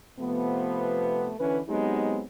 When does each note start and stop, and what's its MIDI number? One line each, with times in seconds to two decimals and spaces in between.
0.19 1.33 48
0.19 1.33 53
0.19 1.33 57
0.19 1.33 59
1.39 1.60 50
1.39 1.60 52
1.39 1.60 61
1.39 1.60 71
1.68 2.21 54
1.68 2.21 56
1.68 2.21 59
1.68 2.21 60
1.68 2.21 63
1.68 2.21 67